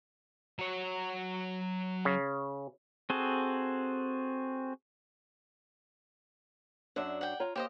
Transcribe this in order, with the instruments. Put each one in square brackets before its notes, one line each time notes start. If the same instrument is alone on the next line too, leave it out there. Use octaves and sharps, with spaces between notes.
[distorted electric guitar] F#3 C#5
[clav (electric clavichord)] C#3
[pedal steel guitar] C4 F#4 G#4 A4
[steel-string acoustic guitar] F#2 F#3 D4 [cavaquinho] E5 F#5
[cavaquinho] F#5 G5
[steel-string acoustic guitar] F4 C#5 A#5
[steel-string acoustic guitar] A#3 [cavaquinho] G4 C5 D#5